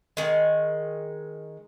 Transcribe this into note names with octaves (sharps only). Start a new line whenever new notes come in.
D#3 G#3